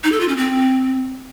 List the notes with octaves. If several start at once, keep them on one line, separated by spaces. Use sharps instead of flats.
D#4
A4
F4
C#4
C4